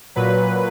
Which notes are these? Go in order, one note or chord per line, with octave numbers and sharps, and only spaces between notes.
A#2 F#3 B4